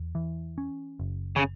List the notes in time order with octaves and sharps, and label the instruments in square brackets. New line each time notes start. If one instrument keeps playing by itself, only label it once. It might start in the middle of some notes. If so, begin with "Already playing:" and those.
Already playing: [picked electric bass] E2
E3
C#4
F#1
[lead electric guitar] C#3